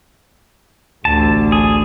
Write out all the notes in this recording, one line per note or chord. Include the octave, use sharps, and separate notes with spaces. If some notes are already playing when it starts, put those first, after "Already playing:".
A1 D2 A5
G#4